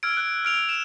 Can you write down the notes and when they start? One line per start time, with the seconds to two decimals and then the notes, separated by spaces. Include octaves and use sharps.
0.03 E6 F6 G#6 D7
0.17 F#6
0.45 F6 D7 F7
0.69 E7